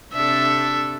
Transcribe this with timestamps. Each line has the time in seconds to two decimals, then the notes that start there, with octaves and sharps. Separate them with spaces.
0.13 C3 D4 A4 E5